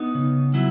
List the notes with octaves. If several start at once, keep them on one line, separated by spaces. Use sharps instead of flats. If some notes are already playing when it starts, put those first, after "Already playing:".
Already playing: B3 D#4
C#3
F#3 E4